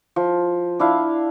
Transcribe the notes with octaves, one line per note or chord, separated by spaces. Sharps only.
F3
D4 E4 F5